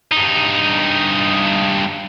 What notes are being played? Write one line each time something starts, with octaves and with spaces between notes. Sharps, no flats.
G2 D#4